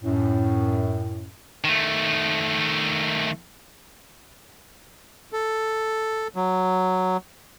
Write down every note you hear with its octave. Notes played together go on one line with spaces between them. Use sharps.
F#2 A2
D#3 A3
A4
F#3